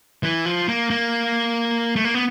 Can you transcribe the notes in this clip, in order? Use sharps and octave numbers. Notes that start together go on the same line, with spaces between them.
E3
F3
A#3
A#3
A3
A#3
B3